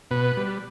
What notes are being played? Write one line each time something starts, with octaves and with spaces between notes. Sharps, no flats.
B2 B4
G3